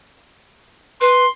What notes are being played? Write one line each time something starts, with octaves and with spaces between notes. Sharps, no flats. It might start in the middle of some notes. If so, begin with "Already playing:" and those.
B4 C6